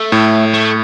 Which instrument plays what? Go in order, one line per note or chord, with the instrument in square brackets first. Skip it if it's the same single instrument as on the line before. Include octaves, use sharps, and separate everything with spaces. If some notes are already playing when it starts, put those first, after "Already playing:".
Already playing: [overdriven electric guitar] A3
[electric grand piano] A2
[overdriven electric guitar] A3